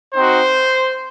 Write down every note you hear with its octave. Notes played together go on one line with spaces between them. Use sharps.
C4 D#4 F#4 C5